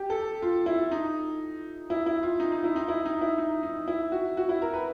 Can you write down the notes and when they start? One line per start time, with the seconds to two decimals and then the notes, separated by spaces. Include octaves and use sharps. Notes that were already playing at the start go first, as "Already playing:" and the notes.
Already playing: G4
0.10 A4
0.42 F4
0.66 E4
0.91 D#4
1.90 E4
2.06 E4
2.23 F4
2.40 D#4
2.52 D#4
2.64 E4
2.76 D#4
2.88 E4
3.05 D#4
3.21 E4
3.38 D#4
3.63 D#4
3.88 E4
4.12 F#4
4.37 F#4
4.49 E4
4.62 A#4
4.73 B4